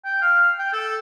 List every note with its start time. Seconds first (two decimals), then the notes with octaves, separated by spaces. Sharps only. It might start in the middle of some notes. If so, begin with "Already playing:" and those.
0.05 G5
0.22 F5
0.59 G5
0.73 A4